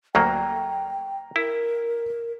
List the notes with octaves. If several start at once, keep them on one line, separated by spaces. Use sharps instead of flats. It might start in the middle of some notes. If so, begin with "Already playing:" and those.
D2 F#3 A#3 G5 A#5
E4 A#4